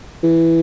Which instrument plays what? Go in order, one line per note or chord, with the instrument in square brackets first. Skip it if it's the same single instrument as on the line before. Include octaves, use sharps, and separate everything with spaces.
[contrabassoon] E3